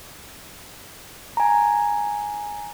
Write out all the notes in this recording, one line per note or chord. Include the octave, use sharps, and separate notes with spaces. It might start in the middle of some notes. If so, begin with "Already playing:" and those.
G#5 A#5